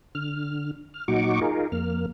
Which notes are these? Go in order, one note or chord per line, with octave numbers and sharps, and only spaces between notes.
D3 F6
F6
A#2 F#3 D#4 F#4 C#6 D6
D#4 F4 G#4 A#4
F2 A#3 F6